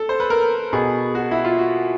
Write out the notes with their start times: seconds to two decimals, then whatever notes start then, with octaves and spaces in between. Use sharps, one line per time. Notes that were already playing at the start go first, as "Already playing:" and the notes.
Already playing: A4
0.09 C5
0.20 B4
0.30 A#4
0.73 B2 G#4
1.15 F#4
1.31 E4
1.45 F4
1.58 F#4